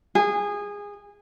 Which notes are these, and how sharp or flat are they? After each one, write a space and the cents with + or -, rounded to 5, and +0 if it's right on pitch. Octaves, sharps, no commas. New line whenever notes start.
G#4 -20